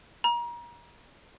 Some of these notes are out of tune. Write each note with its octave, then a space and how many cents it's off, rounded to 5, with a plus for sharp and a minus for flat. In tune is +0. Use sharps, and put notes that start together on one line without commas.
A#5 +35